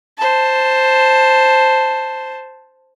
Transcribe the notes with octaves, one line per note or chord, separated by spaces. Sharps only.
C5 A5